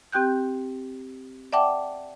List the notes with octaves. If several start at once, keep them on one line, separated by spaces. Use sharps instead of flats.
C4 G4 G5 F#6 G6
D5 E5 F#5 G5 A5 D6